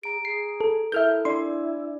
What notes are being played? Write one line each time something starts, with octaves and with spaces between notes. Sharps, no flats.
G#4 A#5 D7
G#4 C7
A4
E4 A4 A#4 E5 F6 G6
D4 E4 D5 C6